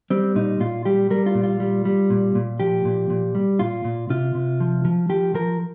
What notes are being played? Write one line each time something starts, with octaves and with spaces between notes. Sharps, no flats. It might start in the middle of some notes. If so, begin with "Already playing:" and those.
G3 C4
A#2 D#4
A#2 F4
G3 G4
G3 A#4
F4
A#2
F4
G3
G3
A#2
A#2
F3 G4
A#2
A#2
G3
A#2 F4
A#2
C3 F4
C3
F3
F3
F3 G4
F3 A#4